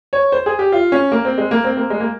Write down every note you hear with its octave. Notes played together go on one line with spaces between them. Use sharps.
C#5
C5
G#4
G4
F4
C#4
A#3
C4
G#3
A#3
C4
A#3
G#3
A#3